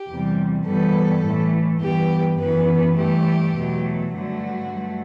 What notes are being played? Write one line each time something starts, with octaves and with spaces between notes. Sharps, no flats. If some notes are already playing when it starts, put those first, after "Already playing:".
Already playing: G4
E2 C3 G3
G2 E3 G3 B3 A4
A2 E3 A3
G2 E3 B3 G4
F#2 E3 B3 B4
G2 E3 A3 G4
E2 B2 F#3 A3
G2 D3 F#3 A3 F#4
G2 F#3 A3